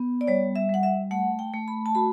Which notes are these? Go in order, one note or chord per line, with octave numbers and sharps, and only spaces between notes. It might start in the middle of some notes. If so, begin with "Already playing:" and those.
Already playing: B3
D5
G3 C#5
E5
G3 F#5
E5
A3 F#5
G5
A3
B5
A5
F#4 B5